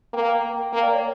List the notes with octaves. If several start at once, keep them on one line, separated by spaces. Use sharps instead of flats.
A#3 G5
A#3 G5
D5
C#5